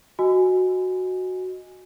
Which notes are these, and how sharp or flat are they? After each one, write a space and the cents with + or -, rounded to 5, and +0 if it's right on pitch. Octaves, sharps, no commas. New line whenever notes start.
F#4 +0 D#5 +0 G#5 +0